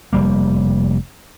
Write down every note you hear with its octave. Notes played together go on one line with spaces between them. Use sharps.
F1 G3 A#3